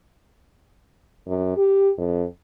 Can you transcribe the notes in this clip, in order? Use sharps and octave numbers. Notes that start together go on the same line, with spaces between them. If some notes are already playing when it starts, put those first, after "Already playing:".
F#2
G4
F2